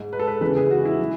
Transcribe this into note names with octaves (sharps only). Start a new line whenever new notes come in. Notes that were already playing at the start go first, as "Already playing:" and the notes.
Already playing: G#2 G#3
B4
A4
B4
E2 C#3 E3 G#3 B4
G#4
F#4
E4
E3